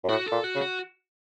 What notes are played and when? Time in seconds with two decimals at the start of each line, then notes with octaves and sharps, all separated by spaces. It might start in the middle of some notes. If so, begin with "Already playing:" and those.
0.04 F#2
0.09 A2 F#4
0.26 A4
0.32 A#2
0.44 F#4
0.55 C#3
0.61 F#4